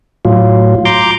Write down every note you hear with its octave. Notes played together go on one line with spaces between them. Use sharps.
A2 F#3 F4
A#5 C6 D6 G6